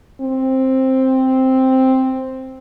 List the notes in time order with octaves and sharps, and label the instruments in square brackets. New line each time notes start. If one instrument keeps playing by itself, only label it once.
[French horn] C4